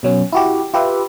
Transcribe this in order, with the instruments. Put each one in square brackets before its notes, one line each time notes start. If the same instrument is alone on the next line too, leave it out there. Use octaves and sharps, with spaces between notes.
[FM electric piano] B2 F#3 C#4
E4 F#4 G4
F4 G4 B4 E5